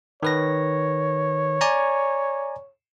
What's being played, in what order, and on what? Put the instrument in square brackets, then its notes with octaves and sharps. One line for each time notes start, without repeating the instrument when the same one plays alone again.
[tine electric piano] D#3 B4 A#6 [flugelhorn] C#5
[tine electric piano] D5 G#5 A#5